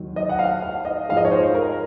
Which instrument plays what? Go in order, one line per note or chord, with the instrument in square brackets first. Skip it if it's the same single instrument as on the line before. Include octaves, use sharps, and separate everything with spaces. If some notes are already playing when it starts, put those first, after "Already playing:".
Already playing: [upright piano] D#2 D#3 F#3
D#5
F#5
F5
F5
D#5
G#2 F3 G#3 F5
D#5
C#5
C5
A#4